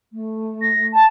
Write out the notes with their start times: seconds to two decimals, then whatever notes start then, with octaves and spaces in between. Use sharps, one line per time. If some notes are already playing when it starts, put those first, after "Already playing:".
0.13 A3
0.61 A#6
0.92 A5